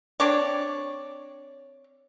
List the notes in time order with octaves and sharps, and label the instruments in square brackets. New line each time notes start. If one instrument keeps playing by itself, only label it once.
[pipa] C4 D4 C#5 D5